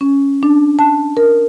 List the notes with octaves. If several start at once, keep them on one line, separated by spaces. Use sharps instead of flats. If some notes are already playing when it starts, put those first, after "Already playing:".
C#4
D4
A5
A#4